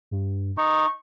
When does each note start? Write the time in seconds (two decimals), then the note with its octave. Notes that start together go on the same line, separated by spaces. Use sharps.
0.11 G2
0.57 D#4 C#6